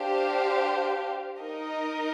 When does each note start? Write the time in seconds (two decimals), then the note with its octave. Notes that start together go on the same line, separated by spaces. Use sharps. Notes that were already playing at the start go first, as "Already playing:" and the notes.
Already playing: D4 G4 C5 F5
1.40 D#4 A#4 D#5